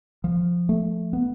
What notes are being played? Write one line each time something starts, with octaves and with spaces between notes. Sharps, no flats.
F3
A3
B3